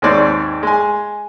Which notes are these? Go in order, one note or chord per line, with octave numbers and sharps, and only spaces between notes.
D#2 G#2 G#3 C4 C#5 D5
G#3 G#5